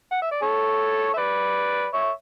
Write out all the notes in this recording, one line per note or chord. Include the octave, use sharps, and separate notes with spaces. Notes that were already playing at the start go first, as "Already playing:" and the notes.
F#5
E5
D5
A4 C#5
E5
B4 D5
C#5 E5